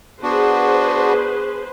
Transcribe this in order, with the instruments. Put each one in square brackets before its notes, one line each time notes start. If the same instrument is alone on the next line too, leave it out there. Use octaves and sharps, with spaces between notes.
[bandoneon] B3 D4 F#4 [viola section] G#4 B4 C5